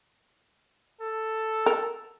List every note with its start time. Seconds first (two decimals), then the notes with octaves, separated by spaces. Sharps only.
1.01 A4
1.66 A#4